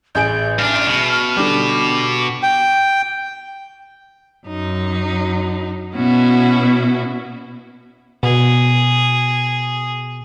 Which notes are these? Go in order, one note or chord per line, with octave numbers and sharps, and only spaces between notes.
A1 G#4 G6 D7
G2 D4 F6
B2
D3 G3 D6
G5
F#2 D#4
B2 B3 C#4 E4 F#4
B2 G#4